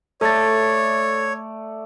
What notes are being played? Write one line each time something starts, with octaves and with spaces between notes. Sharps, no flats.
A3 A4 C#5 D5 A6